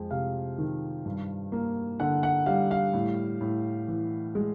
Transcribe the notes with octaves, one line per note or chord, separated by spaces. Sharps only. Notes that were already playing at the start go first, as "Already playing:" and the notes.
Already playing: F2 G#3
C3 F5
D#3
G2
A#3
D3 F#5
F#5
G3 F5
F5
A2
A2
E3
G#3